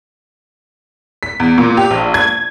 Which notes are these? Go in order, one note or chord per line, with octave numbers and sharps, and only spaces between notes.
B6
E2
A#2
G4
A#1
G#6